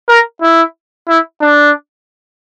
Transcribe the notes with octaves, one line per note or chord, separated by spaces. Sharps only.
A#4
E4
E4
D4